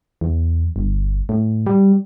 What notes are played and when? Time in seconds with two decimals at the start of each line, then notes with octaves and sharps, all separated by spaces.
0.21 E2
0.76 G1
1.29 A2
1.66 G3